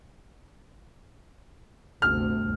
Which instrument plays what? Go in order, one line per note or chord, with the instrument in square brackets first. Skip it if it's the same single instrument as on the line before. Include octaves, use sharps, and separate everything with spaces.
[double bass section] G1 D2 C3 [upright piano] F6